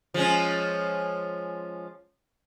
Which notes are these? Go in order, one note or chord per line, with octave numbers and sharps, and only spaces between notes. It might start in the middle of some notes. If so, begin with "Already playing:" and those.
F3 G#3 C#4